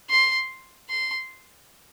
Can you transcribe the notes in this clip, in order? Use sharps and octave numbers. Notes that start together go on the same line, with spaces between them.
C6
C6